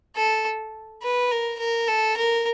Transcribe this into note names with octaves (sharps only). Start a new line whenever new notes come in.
A4
B4
A#4
A#4
A4
A#4